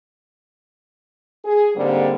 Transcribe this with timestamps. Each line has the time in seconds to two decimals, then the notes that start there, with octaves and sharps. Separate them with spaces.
1.45 G#4
1.76 G#2 D3 G3 A#3 C4